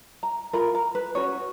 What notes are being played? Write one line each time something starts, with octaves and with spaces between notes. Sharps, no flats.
A#5
F4 A#4 B5
A#5
B4
C#4 F#4 B4 C#5